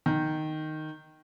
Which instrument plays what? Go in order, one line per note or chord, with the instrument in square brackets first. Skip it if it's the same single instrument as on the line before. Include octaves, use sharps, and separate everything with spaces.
[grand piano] D#3